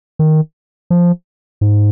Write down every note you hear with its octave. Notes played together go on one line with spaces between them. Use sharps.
D#3
F3
G#2